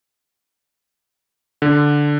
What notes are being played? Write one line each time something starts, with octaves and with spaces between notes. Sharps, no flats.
D3